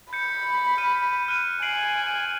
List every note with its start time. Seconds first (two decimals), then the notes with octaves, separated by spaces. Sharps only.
0.13 B5 G6 C#7
0.78 F6 D#7
1.28 F6 F#6 D#7
1.62 G#5 C7 D7 F#7